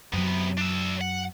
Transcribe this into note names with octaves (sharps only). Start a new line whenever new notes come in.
F#2 C3 F#3 B3
D4 E5
F#5